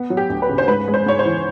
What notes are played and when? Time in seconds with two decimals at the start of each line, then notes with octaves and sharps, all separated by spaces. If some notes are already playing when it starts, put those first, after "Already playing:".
Already playing: B3
0.10 F#3
0.17 G4
0.30 D2
0.42 B4
0.49 C#3
0.58 C5
0.68 G#2 B4
0.88 G#3
0.94 C5
1.06 G#2 C#5
1.19 C5
1.25 E3